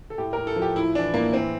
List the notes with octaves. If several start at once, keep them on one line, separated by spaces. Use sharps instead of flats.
A4
A2 G4
A2 A#4
A4
F3
G4
A2 E4
E3 D4
A2 A#3
E3 C4